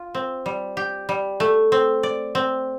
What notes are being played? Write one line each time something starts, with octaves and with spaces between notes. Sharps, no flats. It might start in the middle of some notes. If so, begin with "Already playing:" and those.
Already playing: F4
C4
G3
G4
G3
A3
C4
D5
C4